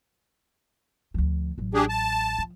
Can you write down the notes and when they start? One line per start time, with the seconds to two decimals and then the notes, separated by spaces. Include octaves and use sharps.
1.14 D2 F3
1.58 A1 F#3
1.74 D4 G4 G#4
1.89 A5
2.38 F3